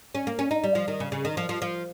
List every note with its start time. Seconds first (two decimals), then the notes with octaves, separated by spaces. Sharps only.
0.15 C#4
0.27 A#3
0.39 C#4
0.51 D#4
0.64 G3
0.75 F3
0.88 D#3
1.00 C#3
1.12 C#3
1.25 D#3
1.37 F3
1.49 F3
1.62 F3